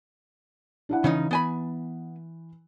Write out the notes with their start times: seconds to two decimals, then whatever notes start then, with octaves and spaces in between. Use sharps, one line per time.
0.89 D4 E4 F#5
1.04 C#3 E3 C#4 D#4
1.31 B3 G#5 B5